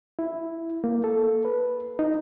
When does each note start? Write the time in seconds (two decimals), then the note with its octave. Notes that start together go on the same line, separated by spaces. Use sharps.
0.19 E4
0.84 A#3
1.04 A4
1.45 B4
1.99 D#4